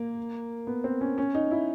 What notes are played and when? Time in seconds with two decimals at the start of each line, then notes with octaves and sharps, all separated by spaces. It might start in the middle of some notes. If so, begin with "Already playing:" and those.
Already playing: A#3
0.67 B3
0.84 C4
1.01 C#4
1.18 C#4
1.35 D#4
1.51 E4